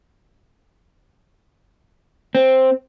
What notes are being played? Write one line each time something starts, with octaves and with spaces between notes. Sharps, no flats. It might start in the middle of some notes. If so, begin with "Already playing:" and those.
C4